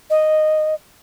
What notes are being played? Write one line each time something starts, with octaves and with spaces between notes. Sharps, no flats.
D#5